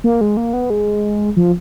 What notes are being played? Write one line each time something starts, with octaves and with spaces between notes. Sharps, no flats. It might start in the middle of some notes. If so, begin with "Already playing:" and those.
A#3
G#3
A#3
B3
G#3
F3